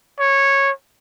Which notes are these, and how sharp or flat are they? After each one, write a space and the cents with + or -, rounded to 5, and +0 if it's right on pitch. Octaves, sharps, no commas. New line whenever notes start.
C#5 -10